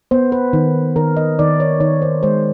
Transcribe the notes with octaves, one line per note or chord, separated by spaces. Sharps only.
B3 C5
B4
D#3
D#3 A#4
D#5
D#3 D5
C#5
D#3 C#5
C5
G#3 C5